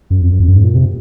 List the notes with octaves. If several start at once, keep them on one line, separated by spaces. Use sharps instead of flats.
F#2
F2
F#2
F2
F#2
G#2
A#2
C3